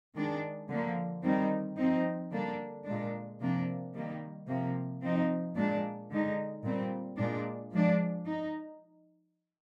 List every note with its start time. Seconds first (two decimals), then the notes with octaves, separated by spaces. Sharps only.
0.15 D#3 G#3 D4
0.69 D3 F3 A#3
1.23 D#3 G3 C4 D#4
1.77 F3 C4 D#4
2.31 D3 G3 A#3 D4
2.85 A#2 G#3 D4
3.40 C3 F3 A#3 D4
3.94 D#3 G3 A#3
4.48 C3 F3 A#3
5.02 F3 C4 D#4
5.55 A#2 G#3 D4
6.10 D3 G#3 D#4
6.64 A#2 G3 C4
7.17 A#2 G#3 D4
7.72 F3 G#3 D4
8.26 D#4